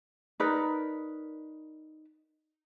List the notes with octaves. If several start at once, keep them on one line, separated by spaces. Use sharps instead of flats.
D#4 A#4 B4 D5